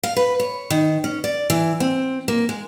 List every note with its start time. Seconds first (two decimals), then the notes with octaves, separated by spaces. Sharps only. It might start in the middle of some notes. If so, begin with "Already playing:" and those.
0.03 F5
0.17 B4
0.40 C#5
0.70 D#3
1.04 C#4
1.24 D5
1.50 E3
1.80 C4
2.28 A#3
2.49 G#3